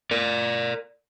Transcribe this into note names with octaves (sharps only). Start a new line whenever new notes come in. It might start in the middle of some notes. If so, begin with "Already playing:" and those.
A#4 D5